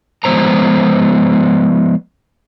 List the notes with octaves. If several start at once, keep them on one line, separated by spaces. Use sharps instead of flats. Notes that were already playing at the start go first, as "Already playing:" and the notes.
F3 G#3 B3 C5 A#5